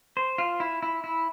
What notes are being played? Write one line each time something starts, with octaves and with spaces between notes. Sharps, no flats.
C5
F4
E4
E4
E4